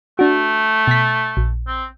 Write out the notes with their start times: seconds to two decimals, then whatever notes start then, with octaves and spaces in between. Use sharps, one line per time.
0.19 A3 D4 F#4
0.87 B2 B6
1.37 A#1
1.67 C4